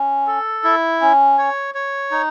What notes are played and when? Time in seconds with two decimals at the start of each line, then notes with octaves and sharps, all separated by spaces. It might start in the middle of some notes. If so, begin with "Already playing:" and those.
Already playing: C#4
0.27 A4
0.64 E4
1.01 C#4
1.38 C#5
1.75 C#5
2.11 D#4